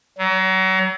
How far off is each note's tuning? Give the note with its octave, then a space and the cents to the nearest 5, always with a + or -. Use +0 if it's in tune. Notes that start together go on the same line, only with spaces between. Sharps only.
F#3 +30